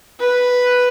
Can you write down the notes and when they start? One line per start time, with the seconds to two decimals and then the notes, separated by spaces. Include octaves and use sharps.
0.20 B4